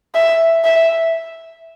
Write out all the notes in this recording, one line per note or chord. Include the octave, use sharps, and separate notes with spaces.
E5
E5